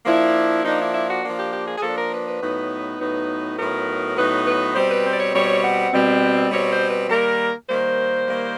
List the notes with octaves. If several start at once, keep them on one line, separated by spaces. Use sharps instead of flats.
F3 A#3 D4 E4
F3 A#3 D4 D#4
E4
E4
F#4
F3 A#3 D4
G4
G4
G#4
G#4
F3 A#3 D4 A4
A#4
B4
B4
A2 F#3 B3 D#4
A2 F#3 B3 D#4
A2 F#3 B3 D#4 A#4
A2 F#3 B3 D#4 B4
B4
B2 G3 C4 C5
B4
C5
D5
C#5
B2 G3 C4 C#5
F#5
B2 G3 C4
B2 G3 C4 C#5
C5
B4
D#3 G3 A#3 A#4
D#3 G3 A#3 C5
D#3 G3 A#3